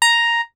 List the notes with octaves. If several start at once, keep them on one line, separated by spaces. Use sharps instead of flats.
A#5